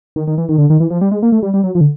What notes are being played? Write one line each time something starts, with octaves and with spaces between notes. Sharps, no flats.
D#3
D#3
E3
D#3
D3
D#3
E3
F3
G3
G#3
A#3
A3
G3
G3
F#3
F3
D3